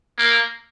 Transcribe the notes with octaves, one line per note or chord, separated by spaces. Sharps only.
A#3